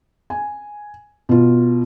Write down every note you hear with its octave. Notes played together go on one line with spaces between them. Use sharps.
G#5
B2 F4